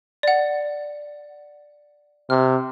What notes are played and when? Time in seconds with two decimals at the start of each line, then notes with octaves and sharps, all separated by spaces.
0.23 D5 F#5
2.30 C3 F6